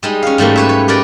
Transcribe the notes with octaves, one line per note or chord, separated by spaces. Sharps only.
G3 G#3 D#4
C#4 F5
G#2 G3 A3 A#3
B4 C#5 E5
C#5
G4 A#4 B4 D5